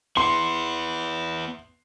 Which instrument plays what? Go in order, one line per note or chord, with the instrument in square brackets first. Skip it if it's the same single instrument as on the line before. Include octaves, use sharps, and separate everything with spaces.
[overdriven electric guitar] B3 E4 [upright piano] C6